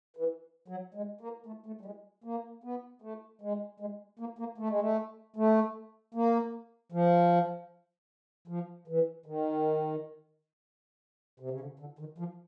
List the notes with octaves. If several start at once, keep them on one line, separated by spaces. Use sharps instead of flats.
E3
F#3
G#3
A#3
A3
A3
G3
G#3
A#3
B3
A3
G#3
G#3
A#3
A#3
A3
G#3
A3
A3
A#3
F3
F3
E3
D#3
C3
C#3
D3
D3
D#3
F3